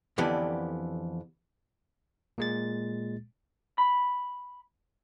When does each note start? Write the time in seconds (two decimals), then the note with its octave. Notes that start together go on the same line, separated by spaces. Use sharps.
0.18 F2 D3 E3 B3 G4 D5
2.38 A#2 G#3 A6
3.78 B5